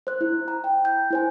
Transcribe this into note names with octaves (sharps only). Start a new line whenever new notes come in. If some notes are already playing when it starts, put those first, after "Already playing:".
C5 F#6
E4
A#5
G5
G6
E4 C5 G#5